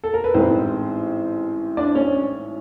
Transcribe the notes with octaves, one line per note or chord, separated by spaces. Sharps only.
A4
A#4
B4
A1 G#2 E3 G#3 C4 C5
D4 D5
C#4 C#5